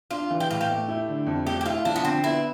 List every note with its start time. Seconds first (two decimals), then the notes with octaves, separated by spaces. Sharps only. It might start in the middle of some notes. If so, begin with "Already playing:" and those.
0.11 D4 F4
0.30 E3
0.40 G4
0.50 A2 F4
0.61 G4
0.70 A3
0.88 E4
1.08 D3
1.26 F2
1.46 A3 G4
1.61 G4
1.66 E4 F4
1.85 F3 D4
1.96 B3
2.04 D3 C4
2.24 B3 E4